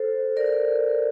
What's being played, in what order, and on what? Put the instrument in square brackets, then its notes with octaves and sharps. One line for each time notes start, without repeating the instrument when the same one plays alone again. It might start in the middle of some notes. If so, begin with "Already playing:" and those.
Already playing: [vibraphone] A4 C5
A#4 D5